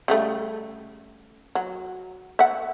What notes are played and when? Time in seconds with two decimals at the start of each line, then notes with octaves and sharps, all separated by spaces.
0.08 C#3 G3 A3
1.55 F#3
2.39 E5 F#5